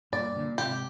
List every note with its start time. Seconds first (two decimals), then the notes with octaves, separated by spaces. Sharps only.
0.12 G2 A#2 D5
0.35 A#2 D3
0.55 D3
0.58 G#2 C3 G4